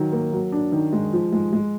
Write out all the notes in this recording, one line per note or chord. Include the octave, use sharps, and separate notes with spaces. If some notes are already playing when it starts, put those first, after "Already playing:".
Already playing: D#3 F#3
A#3
F#3
D4
D#3
G#3
F3
G#3
G#3